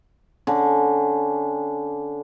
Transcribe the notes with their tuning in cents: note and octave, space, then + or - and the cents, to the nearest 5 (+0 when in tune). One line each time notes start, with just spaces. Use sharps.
D3 -15 C#4 -10